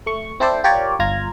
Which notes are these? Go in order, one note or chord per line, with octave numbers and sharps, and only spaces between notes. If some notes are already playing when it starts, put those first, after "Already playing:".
A3 C#6
C4 E4 A4 C5 D5
F4 G4 A#4 C#5 D5
G1 F4 A#5 G#6